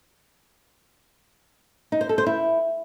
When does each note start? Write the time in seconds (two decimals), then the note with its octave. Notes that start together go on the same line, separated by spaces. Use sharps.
1.92 D#4
2.01 C5
2.09 A4
2.18 C5
2.26 E4